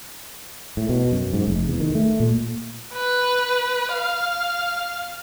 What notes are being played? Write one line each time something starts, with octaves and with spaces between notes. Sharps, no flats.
A2
B2
F#2
G#2
F1
E2
D#3
A3
A#2
B4
F5